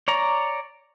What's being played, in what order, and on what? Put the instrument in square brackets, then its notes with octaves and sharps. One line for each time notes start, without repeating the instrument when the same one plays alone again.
[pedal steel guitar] C#5 D5 A#5